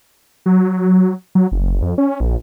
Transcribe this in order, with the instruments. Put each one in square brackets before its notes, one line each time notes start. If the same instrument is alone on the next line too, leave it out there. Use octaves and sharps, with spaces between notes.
[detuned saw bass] F#3
F#3
F#1
F2
C#4
A#1